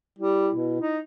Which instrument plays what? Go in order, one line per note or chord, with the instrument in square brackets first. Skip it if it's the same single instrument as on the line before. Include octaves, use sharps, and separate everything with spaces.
[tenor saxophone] G3 [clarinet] E4
[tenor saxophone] B2
D#4